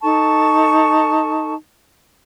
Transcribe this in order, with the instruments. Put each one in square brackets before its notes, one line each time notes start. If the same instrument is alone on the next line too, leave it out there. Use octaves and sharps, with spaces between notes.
[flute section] D#4 A4 A5 C#6